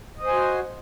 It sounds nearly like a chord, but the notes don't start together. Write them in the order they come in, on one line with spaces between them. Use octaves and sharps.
D#5 C5 G#5 F#4